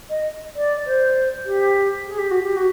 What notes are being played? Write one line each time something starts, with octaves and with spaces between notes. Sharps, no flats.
D#5
D5
C5
G4
G#4
G4
F#4
G4
F#4